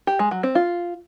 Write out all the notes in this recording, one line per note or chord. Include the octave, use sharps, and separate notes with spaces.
G4
G#3
F#3
C4
F4